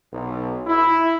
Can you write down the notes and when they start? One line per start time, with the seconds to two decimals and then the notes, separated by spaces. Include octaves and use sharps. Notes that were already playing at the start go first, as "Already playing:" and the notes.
0.12 B1
0.67 E4